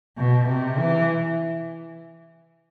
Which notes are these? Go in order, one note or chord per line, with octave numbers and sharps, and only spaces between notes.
B2
C3
E3